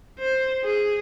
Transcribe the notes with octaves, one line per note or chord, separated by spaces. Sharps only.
C5
G#4